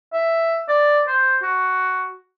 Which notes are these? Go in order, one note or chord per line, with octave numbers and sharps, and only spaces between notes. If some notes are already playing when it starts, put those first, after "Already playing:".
E5
D5
C5
F#4